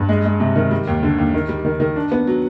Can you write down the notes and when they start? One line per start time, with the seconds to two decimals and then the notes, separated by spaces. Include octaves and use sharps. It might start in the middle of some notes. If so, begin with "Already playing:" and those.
Already playing: G2
0.09 G#3
0.25 G#3
0.40 C3
0.56 D#3
0.71 G3
0.87 D#2
1.03 D3
1.18 D#2
1.34 D#3
1.49 G3
1.65 D#3
1.80 D#3
1.96 D4
2.12 B3
2.27 F#3